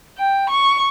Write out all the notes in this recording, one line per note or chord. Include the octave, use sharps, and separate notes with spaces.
G5
C#6